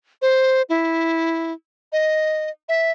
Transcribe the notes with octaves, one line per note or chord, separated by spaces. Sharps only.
C5
E4
D#5
E5